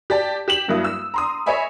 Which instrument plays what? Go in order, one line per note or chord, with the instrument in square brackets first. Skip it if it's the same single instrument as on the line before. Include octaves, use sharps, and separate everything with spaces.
[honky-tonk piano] G4 D5 A5
G4 E7 F#7
G2 F#3 A#3 E4 D#6
E6
A#5 C6 D#6
C#5 D#5 E5 G#5 B5